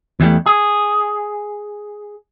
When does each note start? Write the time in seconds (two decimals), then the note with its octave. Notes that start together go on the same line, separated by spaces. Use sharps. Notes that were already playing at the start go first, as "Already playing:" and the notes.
0.20 E2 E3 G3 A3
0.46 G#4